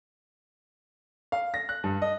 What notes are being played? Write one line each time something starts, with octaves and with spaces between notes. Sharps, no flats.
F5
A#6
F#6
G2
D#5